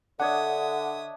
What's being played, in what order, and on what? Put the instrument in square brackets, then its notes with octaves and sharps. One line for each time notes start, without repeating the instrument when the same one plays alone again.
[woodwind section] D3 [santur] D4 C#5 D#5 [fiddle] E5 D#6 [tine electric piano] F#5